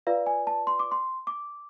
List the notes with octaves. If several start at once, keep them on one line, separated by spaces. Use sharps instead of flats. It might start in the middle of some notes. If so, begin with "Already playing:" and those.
F4 B4 D5 F5
G#5
A5
C6
D6
C6
D6